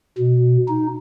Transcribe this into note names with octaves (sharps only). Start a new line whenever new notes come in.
B2
D#4